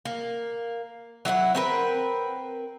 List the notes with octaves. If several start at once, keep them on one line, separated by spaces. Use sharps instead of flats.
A#3
F#3 E4 D#5 F#5
C4 A#4 B4